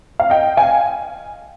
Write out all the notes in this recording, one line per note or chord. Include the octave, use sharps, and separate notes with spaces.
F5
D#5 G5
F5 G#5